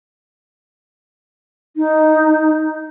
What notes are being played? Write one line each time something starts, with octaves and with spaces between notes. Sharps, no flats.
D#4